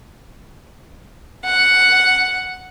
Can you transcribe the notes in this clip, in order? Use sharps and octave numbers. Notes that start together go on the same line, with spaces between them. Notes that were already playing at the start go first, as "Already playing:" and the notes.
F#5